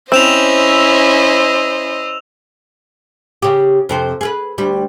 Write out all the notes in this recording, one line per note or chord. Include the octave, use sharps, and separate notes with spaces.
C4 C#4 E4 C5 D#5 E6 E7 F7
C#3 G4
F2 C3 C5
G#4 A#4 B4
D2 G3